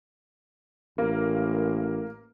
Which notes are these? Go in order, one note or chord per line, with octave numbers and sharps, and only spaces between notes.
A1 A#3